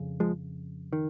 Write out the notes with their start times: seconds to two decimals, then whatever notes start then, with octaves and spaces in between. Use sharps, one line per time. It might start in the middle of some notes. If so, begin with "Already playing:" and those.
Already playing: F2 C#3
0.20 F3 G#3
0.93 D#3